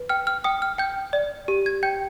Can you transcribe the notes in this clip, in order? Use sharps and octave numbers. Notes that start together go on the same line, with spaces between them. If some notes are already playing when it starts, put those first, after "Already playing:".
Already playing: B4
G5 F6
F6
G5 D#6
F6
G5 G6
D5
G4
G#6
G5 G6